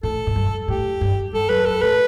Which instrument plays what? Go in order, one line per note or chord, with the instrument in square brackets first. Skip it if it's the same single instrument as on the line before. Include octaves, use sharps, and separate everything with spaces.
[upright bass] A2 [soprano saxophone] A4
[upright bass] A2
G2
[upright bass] A2 [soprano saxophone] G4
[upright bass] G2
[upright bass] G2 [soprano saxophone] A4
[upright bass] F#2 [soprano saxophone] B4
[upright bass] F#2 [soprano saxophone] A4
[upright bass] A2 [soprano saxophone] B4